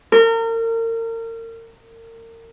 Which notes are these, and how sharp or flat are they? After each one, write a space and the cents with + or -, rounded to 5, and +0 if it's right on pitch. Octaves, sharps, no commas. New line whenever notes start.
A#4 -35